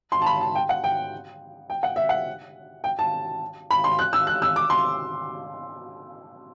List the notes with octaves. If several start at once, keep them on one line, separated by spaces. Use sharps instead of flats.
C6
A5
B5
A5
G5
F#5
G5
G5
F#5
E5
F#5
G5
A5
B5
C6
F#6
E6
F#6
E6
D6
C6